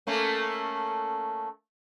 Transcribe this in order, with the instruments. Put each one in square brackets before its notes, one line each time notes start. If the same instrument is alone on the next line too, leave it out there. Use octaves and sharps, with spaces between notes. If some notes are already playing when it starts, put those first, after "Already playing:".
[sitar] A3 A#3 C#4